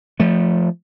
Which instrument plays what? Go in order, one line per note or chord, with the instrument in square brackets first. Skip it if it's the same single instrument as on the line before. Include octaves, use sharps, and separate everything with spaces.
[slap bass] F3 A3